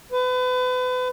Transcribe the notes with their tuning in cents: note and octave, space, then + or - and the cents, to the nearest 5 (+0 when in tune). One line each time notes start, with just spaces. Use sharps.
B4 +35